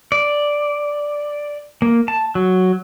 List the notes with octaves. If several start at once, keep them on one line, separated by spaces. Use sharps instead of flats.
D5
A#3
A5
F#3